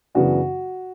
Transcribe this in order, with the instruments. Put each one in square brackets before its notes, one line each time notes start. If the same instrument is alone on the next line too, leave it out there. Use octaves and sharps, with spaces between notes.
[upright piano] F#2 C#3 E3 B3 D4 F#4